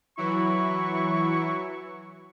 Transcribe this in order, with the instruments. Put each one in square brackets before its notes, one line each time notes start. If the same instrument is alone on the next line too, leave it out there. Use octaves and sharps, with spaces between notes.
[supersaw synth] E3 F#3 E4 [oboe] C#6